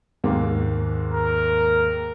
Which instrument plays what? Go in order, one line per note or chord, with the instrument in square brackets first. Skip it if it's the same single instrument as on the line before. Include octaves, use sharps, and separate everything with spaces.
[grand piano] D#2 G#2 A#3
[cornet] A#4